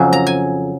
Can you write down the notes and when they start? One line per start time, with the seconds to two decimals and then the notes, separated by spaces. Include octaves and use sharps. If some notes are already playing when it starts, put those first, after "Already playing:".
Already playing: F2 C#3 F#3 G#5
0.13 A#5
0.27 G#5